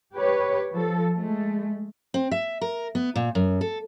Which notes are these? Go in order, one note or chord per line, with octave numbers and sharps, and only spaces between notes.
G4 B4 C#5
F3 A4
G#3 A3
C4
E5
A#4
B3
A#2
F#2
A4